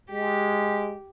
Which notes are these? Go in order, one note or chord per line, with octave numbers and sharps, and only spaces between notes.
G#3 G4